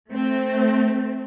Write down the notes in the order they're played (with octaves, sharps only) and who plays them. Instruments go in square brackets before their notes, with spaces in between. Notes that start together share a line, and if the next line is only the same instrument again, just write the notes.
[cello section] A3 C4